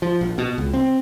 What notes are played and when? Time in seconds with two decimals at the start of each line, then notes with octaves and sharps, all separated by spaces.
0.02 F3
0.21 A#1
0.38 B2
0.58 C#2
0.74 C4